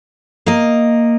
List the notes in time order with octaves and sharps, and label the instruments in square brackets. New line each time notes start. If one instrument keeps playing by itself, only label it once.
[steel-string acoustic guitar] A#3 D#5